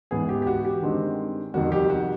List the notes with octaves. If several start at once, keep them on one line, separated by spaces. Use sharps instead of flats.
G#2 E3 G#3 B3 G#4
G4
G4
F#4
G4
G2 D#3 G#3 C4
F2 C3 D#3 G3 F#4
G4
F#4